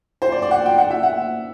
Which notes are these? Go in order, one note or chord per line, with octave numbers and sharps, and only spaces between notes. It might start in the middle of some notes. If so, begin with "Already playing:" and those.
C5
D5
D5
F#5
G5
F#5
E5
F#5